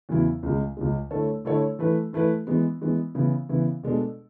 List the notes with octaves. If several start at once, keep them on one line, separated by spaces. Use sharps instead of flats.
E2 C#3 F#3 B3 E4
C#2 C#3 G#3
C#2 C#3 G#3
D3 A3 E4 A4 C#5
D3 A3 E4 A4 C#5
E3 A3 E4 B4
E3 A3 E4 B4
E3 G#3 B3
E3 G#3 B3
C#3 E3 B3 E4
C#3 E3 B3 E4
B2 G#3 D4 A4